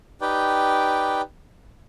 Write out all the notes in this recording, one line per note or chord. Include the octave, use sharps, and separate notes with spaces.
D#4 G4 B4 D5 G5